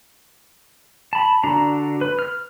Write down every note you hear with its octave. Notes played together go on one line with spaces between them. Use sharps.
A5 B5
D3 D4 F#4 A#5
B4
F6